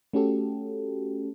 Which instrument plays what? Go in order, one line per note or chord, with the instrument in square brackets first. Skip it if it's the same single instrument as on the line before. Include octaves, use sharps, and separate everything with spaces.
[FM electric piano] A3 C#4 F#4 G4 A4